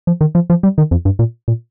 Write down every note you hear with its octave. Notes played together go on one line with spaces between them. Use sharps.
F3
D#3
F3
F3
G3
D#3
F2
G2
A#2
A#2